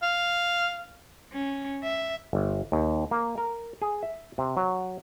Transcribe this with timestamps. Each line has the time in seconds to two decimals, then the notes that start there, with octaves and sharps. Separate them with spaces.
0.03 F5
1.33 C#4
1.84 E5
2.33 G1
2.72 D#2
3.11 A#3
3.38 A#4
3.82 G#4
4.03 E5
4.38 C3
4.57 F#3